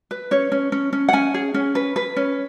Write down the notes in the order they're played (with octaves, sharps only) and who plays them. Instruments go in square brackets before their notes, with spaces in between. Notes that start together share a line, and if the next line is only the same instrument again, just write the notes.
[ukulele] B4
C#4 C#5
C#4
C#4
C#4
F#5
C#4 G#5
G#4
C#4
B4
B4
C#4